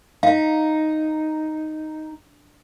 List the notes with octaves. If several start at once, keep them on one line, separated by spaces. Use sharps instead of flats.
D#4 F5